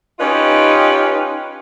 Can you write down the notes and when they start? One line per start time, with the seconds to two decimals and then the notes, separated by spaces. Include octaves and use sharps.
0.19 C#4 D#4 F4 G4 B4